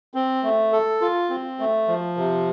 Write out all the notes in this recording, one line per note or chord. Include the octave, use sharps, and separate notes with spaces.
C4
A3
A4
F4
C4
A3
F3
C3